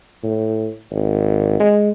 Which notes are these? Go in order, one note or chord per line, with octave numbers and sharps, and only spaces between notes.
A2
G#1
G#3